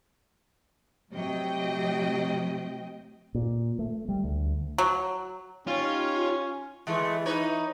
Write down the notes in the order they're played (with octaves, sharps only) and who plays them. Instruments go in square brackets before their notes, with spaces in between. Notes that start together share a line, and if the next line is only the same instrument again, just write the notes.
[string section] A2 C3 F#3 D#5 G5
[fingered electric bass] A#2
A3
G3
D2
[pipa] F#3
[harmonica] C#4 [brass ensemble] D#4 G4 C#5 [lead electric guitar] F4
[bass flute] E3 [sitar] G#3 A3
[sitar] D#4 B4 C#5